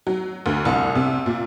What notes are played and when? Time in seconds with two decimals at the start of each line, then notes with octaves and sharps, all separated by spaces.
0.07 F#3
0.46 D2
0.65 C2
0.95 C3
1.26 A#2